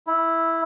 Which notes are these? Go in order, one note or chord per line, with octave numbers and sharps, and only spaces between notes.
E4